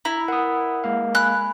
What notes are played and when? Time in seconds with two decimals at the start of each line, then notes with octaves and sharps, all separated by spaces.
0.05 E4 A#5
0.28 A#4 F#5 D#6
0.84 G#3 A#3 F5
1.15 G#5 B5 F#6